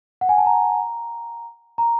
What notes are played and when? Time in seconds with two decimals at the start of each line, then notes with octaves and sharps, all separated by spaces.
0.21 F#5
0.29 G#5
0.38 A5
0.46 A#5
1.78 A#5